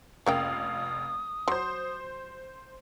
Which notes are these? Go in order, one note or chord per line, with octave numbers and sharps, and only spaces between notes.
F1 C#3 A#3 F5 G5 D#6
F#3 C5 C6